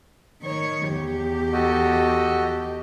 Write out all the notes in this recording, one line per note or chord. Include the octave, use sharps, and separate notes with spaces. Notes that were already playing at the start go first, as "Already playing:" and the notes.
D#3 C#5
E2 G4
F#4 A4 D#5